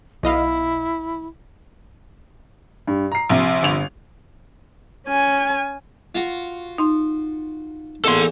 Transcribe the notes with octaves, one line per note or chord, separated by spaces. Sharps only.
B1 E4 D#5 F5
G2
A#5 C7
A#1 C3
G1 F7
C#4 G#5
F4 F#4 C#6
D#4 C6
E2 A#3 F#4 A4 C6